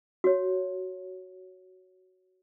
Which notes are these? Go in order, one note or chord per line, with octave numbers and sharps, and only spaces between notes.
F#4 C#5